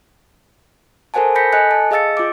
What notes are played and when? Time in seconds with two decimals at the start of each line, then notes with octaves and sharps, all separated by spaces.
1.14 A4 A#4 C5 F#5 G#5 A5
1.35 B5 G6 A#6 B6 C#7
1.53 A4 D#5 G#5 F#6 C#7
1.71 A5
1.91 G#4 D#5 F5 E6 A6 C#7
2.17 F4 D6